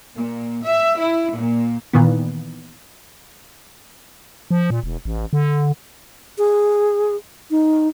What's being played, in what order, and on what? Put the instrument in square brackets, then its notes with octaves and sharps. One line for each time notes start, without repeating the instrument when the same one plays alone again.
[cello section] A#2
E5
E4
A#2
[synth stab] A#2 D#3 E3 B3
[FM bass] F3
A#2
E1
A1
D3
[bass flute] G#4
D#4